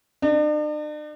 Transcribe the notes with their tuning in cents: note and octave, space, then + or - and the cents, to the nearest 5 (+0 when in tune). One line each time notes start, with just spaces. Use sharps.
D4 +45